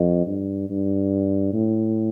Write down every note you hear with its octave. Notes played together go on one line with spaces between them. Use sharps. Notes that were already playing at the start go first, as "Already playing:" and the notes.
Already playing: F2
G2
G2
A2